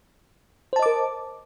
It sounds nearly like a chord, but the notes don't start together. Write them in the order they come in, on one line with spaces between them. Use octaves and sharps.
C5 A5 D#5 D6 A#4